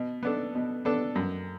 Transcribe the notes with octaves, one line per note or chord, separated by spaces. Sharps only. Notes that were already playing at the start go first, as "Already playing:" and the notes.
Already playing: B2
B3 D4 A4
B2
B3 D4 A4
F#2